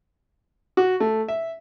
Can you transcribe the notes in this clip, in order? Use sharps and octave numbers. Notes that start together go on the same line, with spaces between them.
F#4
A3
E5